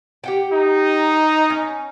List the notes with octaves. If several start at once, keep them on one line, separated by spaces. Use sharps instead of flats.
G4 F#5 G5
D#4
C#4